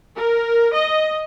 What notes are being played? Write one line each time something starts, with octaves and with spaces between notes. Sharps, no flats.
A#4
D#5